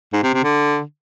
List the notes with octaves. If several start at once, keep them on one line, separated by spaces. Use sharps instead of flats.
G#2
C3
C3
D3